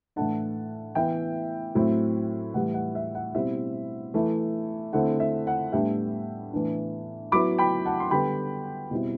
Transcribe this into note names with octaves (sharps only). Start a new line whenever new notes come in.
A2 E3 A3 D4 F#5 A5
E3 B3 E4 E5 G5
A2 F#3 C4 E4
A2 E3 G3 F#5
F#5
E5
F#5
B2 G3 C4 E4 E5
E3 A3 E4
D3 A3 C4 E4 F#5
E5
F#5
A2 G3 B3 D4 E5 G5
A2 E3 B3 D4
F#3 B3 E4 B5 D6
G5 B5
F#5 A5
C6
D3 G3 B3 G5 B5
B2 G3 C4 E4